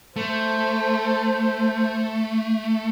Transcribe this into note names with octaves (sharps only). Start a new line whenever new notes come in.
A3 C5